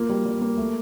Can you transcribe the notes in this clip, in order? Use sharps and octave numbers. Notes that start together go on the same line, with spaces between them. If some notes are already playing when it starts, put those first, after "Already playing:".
Already playing: A#3 F4
G3
G3
A#3
A3